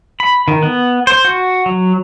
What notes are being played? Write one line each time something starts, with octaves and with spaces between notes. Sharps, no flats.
B5
D#3
B3
C5
F#4
F#3